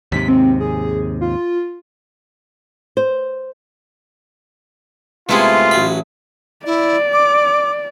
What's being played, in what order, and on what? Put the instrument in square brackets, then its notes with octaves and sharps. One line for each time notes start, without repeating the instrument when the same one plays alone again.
[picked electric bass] D#2 G#2 C3 [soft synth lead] B6
[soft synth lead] C4
G#4
F4
[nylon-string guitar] C5
[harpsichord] C3 G#3 B3 [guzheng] A3 E4 G#4 [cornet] F4
[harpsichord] A1 F#3 B5
[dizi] E4 [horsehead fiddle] D5
[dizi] D6